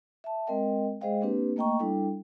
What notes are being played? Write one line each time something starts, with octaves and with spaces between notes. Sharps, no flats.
E5 A5
G#3 C4 A#4 D#5 G5
G#3 G#4 C5 D#5 F5 G5
A#3 C4 D4 G4 B4
A3 A#3 D#5 G5 A#5 C#6
G3 D4 E4 A4 G5